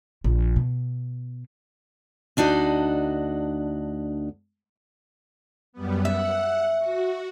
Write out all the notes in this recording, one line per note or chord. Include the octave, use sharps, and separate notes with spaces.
A#1
B2
D2 D4 D#4 F#4
F#2 G3 B3
E5 F#5
F#4